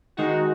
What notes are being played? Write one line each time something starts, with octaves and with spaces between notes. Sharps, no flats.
D#3 G#3 D#4 F#4